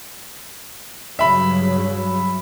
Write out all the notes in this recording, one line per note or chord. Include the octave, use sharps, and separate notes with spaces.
G2 C#3 F#3 E5 B5